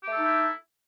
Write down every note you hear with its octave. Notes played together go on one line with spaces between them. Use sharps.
A3 D#4 E4 G4 A4